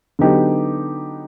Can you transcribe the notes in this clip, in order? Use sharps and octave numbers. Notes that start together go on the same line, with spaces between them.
D3 F#3 B3 D#4 G4